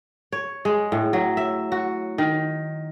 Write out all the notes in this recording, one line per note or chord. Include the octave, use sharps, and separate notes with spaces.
C#5
G#3
A2
F#3
E5
F#4
D#3